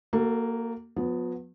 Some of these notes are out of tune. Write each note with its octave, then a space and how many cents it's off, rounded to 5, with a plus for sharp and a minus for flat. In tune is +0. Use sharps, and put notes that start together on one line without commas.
A#3 -10 F#4 +15 A4 +20
F3 +45 B3 +0